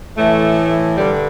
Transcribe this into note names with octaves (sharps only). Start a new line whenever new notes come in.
A2 E3 A3
G2 D3 G3